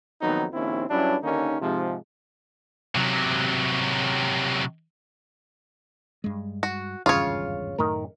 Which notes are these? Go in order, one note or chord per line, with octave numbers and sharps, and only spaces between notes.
F2 A#2 D#3 F#3 B3 D#4
A#1 D#2 D#3 C4 C#4 E4
G2 F#3 C#4 D4 E4
D#2 D3 D#3 A#3 C#4 D#4
G#2 C3 F3
C3 F#3
G2 G#3
F#4
G#1 E2 G2 C#3 F4 C#5
F#2 A2 D#3 A3 A#4